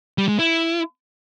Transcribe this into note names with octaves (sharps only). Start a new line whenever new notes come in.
G3
G#3
E4